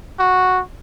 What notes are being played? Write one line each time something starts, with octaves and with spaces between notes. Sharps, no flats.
F#4